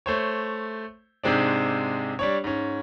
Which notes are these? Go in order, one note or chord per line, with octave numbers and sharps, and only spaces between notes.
A3 C5 C#5
G#2 C3 G#3 C4 D4
G3 D4 C#5
G#2 C#4